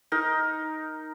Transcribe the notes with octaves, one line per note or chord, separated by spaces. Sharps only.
D#4 A#4